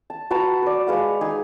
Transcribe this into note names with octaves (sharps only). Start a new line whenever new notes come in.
A5
F#4 B4 A5 A#5
B4 D5
G#3 B4 F5 F#5
D#4 G#4